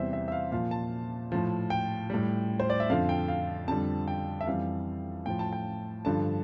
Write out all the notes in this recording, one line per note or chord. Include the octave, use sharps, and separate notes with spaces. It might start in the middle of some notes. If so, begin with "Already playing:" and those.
Already playing: E2 C3 E3 G3 C5 E5
E5
E5
F5
A#2 F3 F5
A5
A2 F3
G5
A2 G3
C5
D5
E5
F2 D3 F3 F5
G5
F5
F2 D3 G3 A5
G5
E5
F2 E3 G3 F5
A2 F3 G5
A5
G5
G2 D3 F3 A5